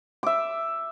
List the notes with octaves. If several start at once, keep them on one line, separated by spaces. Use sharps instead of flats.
E5 D6